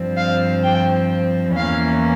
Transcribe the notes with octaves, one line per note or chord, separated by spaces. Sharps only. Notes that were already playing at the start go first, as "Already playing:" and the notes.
Already playing: G2 F3 C4
F5
G5
E2 E3 A#3 C#4 F5